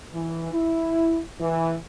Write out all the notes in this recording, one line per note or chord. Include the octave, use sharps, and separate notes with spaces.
E3
E4
E3